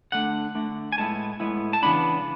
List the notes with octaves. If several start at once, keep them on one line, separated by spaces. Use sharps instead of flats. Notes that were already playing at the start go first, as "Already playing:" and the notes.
D3 A3 D4 F#5
D3 A3 D4
G#5
A2 G#3 B3 E4 A5
A2 G#3 B3 E4
A5
C#3 E3 B3 D4 B5